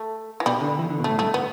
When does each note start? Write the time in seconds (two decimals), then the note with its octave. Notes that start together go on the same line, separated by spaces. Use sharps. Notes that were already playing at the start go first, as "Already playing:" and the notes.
Already playing: A3
0.40 E3
0.46 B2 G3
0.61 D3
0.79 E3
0.89 D3
0.99 B2
1.04 A2 A3
1.19 G2 A3
1.34 B3